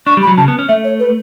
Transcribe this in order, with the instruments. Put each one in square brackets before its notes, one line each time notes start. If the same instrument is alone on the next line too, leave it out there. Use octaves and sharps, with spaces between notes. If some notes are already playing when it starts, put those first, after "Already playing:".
[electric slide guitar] D4 [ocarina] C#6
[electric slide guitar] G3
[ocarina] B5
[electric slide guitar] F#3
[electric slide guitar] C#3 [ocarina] A5
[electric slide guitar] B3
C#4
[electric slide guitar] A3 [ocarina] E5
[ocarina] C#5
B4